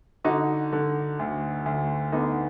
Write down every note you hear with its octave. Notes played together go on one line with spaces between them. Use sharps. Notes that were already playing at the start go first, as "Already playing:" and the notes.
D3 D#4 F#4
D3
D2
D2
D3 B3 D#4